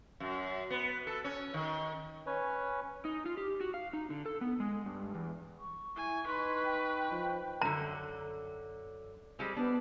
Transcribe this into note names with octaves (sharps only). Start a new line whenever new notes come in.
F#2
B3
A4
C#4
D#3
C#4 B4 C#5 G#5
D#4
F4
G4
F#4
F5
D#4
D3
A4
B3
G#3
G2
E2
C#6
E4 G#5
D#4 B4 C6
G5
F3
F#2 D3 A#5
G3 G#3 C4
B3 D4